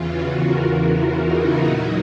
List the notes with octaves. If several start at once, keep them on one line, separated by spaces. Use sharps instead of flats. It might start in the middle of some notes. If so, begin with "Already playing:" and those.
Already playing: E2 C#3 E3 F4
F#4
A#4
E4
D#4
A#2 F#3 D#4